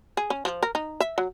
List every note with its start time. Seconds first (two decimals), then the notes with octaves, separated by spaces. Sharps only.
0.17 G#4
0.30 C#4
0.45 F3
0.63 A#4
0.75 D#4
1.00 E5
1.18 F#3